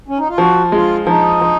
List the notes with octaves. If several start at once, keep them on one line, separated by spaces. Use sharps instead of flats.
C#4
D#4
F4
F3 F#4
G#3 F4
F3 D#4
F3